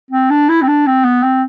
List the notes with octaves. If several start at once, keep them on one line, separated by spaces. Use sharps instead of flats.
C4
D4
E4
C4
D4
C4
B3
C4